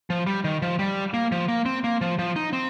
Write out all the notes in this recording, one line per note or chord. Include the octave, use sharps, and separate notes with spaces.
F3
G3
D#3
F3
G3
A#3
F3
A#3
C4
A#3
F3
F3
D#4
C4